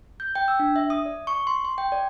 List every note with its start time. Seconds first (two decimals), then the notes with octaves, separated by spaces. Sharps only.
0.20 G6
0.35 G5
0.48 E6
0.59 D4
0.76 E5
0.90 D#6
1.06 D5
1.27 C#6
1.47 C6
1.65 C6
1.78 G5
1.92 D5